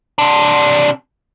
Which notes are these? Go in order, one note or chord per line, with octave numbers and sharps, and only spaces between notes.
C3 D4